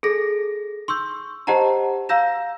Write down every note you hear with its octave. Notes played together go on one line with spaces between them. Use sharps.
G#4 A4 A#6
C6 C#6 E6 G6
G4 C5 D#5 F#5 A5 A#5
F5 A#5 E6 G6 A#6 E7